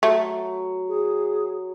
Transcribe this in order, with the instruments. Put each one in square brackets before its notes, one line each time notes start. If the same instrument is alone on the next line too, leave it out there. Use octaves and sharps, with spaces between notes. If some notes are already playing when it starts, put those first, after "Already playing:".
[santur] F#3 [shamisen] A3
[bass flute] G#4